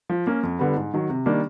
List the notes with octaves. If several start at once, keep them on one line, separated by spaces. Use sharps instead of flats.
F3
A#3 C#4
F2
D3 G3 B3
G#2
D#3 F#3
C3
D#3 G3 A#3 D4